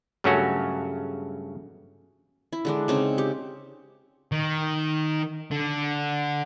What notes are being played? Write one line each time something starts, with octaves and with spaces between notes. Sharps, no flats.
G2 C#3 F#3 A3 C#4 F#4
E4
D3 G#3 D4
C#3 C4 D#4
G4
D#3
D3